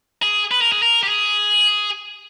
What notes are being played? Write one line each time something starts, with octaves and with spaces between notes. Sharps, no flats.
G#4
B4
A#4
G#4
A#4
G4
G#4